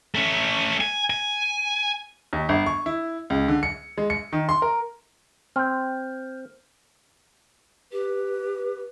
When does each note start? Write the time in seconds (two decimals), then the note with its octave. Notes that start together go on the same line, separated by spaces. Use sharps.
0.15 A3 C#4
0.81 G#5
1.10 G#5
2.33 D#2
2.49 G1
2.66 C#6
2.86 E4
3.30 C#2
3.48 D3
3.63 C#7
3.98 G#3
4.10 C#7
4.33 D#3
4.49 C6
4.62 A#4
5.56 C4 F6 G6
7.92 G4 B4